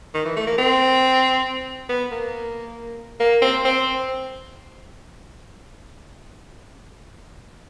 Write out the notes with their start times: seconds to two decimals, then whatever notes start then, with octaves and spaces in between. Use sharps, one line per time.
0.14 D#3
0.25 E3
0.36 A3
0.47 A#3
0.58 C4
1.89 B3
2.11 A#3
3.20 A#3
3.42 C4
3.65 C4